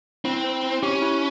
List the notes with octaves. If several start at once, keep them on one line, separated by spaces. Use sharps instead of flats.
C4 E4
C5
E4
C#4 G4
E4